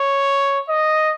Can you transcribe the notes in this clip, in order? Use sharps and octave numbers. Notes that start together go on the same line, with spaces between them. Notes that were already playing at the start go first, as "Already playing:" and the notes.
Already playing: C#5
D#5